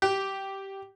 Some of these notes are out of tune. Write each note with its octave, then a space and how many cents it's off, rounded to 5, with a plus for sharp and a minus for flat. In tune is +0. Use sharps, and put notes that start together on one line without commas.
G4 -10